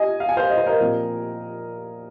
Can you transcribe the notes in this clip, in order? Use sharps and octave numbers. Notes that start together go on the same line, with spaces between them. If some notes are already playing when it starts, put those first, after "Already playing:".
Already playing: D#5 G#5
F5
G#5
C5 F5
D#5
C5
A#4 D#5
A#2 F3 C4